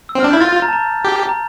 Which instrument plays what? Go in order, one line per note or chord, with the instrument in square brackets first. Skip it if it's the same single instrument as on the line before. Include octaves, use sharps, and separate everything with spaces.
[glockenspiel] E6
[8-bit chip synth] C4
[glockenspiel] F6
[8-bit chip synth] D4
[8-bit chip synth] E4 [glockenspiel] G6
[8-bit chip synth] F4 [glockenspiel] A6
[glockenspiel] A6
A#5
A5
A#5
[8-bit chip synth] G4
[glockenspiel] A#5